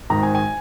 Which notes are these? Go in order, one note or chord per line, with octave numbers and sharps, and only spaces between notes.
G#1 G#2 D#3 A#5
G#5
G#5